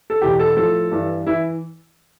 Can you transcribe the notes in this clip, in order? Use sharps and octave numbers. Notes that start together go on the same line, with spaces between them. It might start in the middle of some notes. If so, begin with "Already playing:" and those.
A4
E2 B2 G4
A4
A2 F3 A4
G2 E3
E3 E4